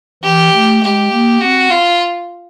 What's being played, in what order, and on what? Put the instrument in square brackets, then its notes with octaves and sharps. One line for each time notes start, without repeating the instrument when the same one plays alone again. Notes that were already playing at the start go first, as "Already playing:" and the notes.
[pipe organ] E3 [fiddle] G4
[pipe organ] A3
[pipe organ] G#3 [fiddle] G4
[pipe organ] A#3
[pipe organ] C4 [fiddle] F#4
[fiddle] F4